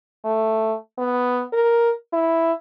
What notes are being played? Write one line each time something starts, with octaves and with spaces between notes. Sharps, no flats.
A3
B3
A#4
E4